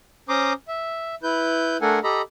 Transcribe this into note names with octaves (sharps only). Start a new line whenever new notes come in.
C#4 C5 A#5 C6 D6 D#6
E5
E4 B4 G6
A3 D4 A4 A#4 F#5 G#5
G4 A4 D#5 A#5 B5